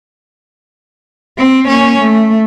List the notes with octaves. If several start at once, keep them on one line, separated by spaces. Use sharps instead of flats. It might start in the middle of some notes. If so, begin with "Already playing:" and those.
C4
A#3 C#4
A3